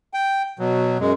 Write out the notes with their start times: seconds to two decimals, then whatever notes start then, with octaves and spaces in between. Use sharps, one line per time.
0.14 G5
0.59 B2 F#3
0.99 F#2 G#3